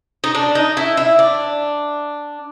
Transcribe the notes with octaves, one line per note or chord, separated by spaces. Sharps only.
D#4
D4
D#4
E4
E4
D4